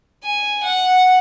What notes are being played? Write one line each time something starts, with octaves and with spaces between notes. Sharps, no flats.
G#5
F#5